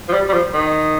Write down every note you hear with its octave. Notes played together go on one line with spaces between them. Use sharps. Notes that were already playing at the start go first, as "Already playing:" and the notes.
F3
G3
G3
F3
D#3